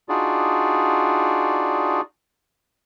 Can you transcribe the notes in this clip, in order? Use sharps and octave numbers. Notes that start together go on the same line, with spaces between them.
D4 D#4 F4 F#4 G#4 D5